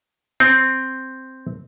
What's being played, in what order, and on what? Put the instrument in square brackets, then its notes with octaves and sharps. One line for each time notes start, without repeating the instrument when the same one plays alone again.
[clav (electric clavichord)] C4